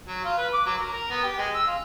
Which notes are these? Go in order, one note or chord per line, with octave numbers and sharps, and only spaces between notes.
F#3
F4
B4
D6
F#3
A#4
A#4
B3
G4
G#3
E6
F4